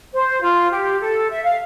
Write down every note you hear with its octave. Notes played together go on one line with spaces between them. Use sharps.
C5
F4
G4
A4
E5
F5